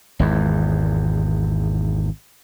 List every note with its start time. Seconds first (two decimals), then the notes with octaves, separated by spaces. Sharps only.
0.19 G#1 E2